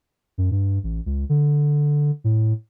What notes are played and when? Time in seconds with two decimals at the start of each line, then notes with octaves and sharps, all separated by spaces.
0.38 F#2
0.51 G2
0.83 A1
1.06 C#2
1.29 D3
2.24 A2